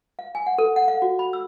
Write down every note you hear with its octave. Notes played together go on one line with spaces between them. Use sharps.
F5
G#5
F#5
A4
F#5
F5
F#4
B5
E6